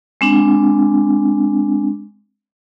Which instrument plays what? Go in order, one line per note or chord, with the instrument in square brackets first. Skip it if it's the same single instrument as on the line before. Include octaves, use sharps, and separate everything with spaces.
[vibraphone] G#3 C4 D4